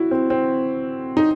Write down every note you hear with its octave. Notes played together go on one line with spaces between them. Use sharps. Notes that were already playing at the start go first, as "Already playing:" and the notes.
Already playing: E4 F#4
C4
C4
D#4